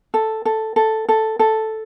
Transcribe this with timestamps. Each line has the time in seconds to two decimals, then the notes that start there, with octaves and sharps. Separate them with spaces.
0.14 A4
0.45 A4
0.76 A4
1.09 A4
1.39 A4